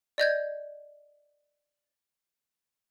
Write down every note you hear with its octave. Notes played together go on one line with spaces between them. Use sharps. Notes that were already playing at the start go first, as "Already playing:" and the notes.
D5 D#5 G6 G#6